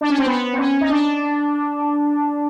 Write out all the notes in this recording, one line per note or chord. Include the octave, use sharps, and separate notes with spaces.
D4
C#4
C4
B3
C4
C#4
D#4
D4